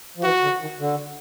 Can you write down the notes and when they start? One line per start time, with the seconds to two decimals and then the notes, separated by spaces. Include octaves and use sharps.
0.17 F3
0.23 E3 F#4
0.42 D3
0.60 D#3
0.79 D3